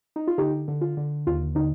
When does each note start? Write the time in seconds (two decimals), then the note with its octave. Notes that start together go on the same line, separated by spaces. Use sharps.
0.16 D#4
0.28 F4
0.38 D3 D#4 G4
0.68 D3
0.81 F4
0.97 D3
1.27 D#2 F4
1.55 D3 D#4